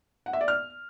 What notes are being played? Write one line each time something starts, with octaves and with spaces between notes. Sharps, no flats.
F#5
E5
D5
F6